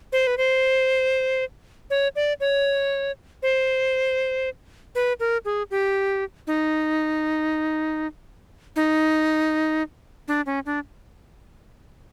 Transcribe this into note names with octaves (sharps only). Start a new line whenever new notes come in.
C5
B4
C5
C#5
D5
C#5
C5
B4
A#4
G#4
G4
D#4
D#4
D4
C#4
D4